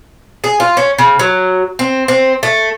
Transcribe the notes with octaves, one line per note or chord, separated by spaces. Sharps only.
G#4
F4
C#4
C#3
F#3
C4
C4
A3